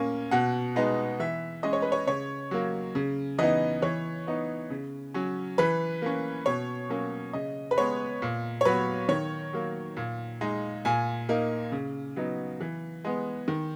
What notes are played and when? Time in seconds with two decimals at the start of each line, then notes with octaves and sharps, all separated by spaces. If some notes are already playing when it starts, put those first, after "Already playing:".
Already playing: A#2 A#3 C#4
0.31 B2 F#5
0.76 G#3 B3 D#4
1.20 E3 E5
1.63 G#3 C#4 D#5
1.73 C#5
1.82 B4
1.92 C#5
2.07 C#3 C#5
2.51 F#3 A#3
2.95 C#3
3.38 E3 B3 D#4 D#5
3.82 E3 C#5
4.27 B3 D#4
4.70 C#3
5.14 F#3 C#4
5.58 E3 B4
6.02 A#3 C#4
6.46 B2 C#5
6.90 F#3 A#3 C#4
7.33 C#3 D#5
7.71 B4
7.77 G#3 B3 C#5
8.22 A#2
8.61 C#5
8.65 F#3 B3 B4
9.09 D#3 C#5
9.53 F#3 A#3
9.97 A#2
10.41 G#3 D#4
10.85 A#2 G#5
11.29 A#3 D#4
11.72 C#3
12.16 F#3 B3 D#4
12.60 E3
13.04 G#3 B3
13.48 D#3